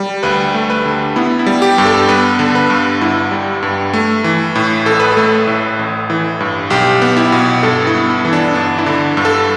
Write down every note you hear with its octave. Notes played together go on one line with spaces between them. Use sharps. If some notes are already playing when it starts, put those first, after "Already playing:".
Already playing: G3
D2 B4
A3
B4
D3
B3 E4
E4
G3
G4
G2
A4
B3 B4
D3
B4
G2
G1 E4
G3
G2
A3
E3
A2
A1 A4
B4
A3 A4
A2
A1
E3
G2
B1 G4
B3
E4
B2
G2 A4
E4
B3
E4
E3
D4
G1 D4
E4
D3
G2
A4